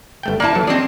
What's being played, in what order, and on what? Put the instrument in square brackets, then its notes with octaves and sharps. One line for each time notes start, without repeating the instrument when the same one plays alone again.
[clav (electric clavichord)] G1 A3 G5
[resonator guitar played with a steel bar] A#3 G#5 A5 [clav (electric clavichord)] E4 D5
[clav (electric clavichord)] E3 F#3 A4
[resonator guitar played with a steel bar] C4 G#4 [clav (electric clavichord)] D5 D#5